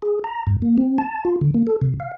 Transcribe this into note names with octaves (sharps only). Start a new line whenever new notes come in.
G#4
A#5
G2
A#3
C4
A5
F4
D3
A#3
A4
C3
F5